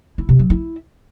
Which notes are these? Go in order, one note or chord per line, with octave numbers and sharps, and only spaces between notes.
E4
C3
F#3
E4